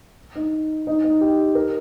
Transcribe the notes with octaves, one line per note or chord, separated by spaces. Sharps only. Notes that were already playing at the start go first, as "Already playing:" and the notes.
D#4
D#4
D#4
G4
A#4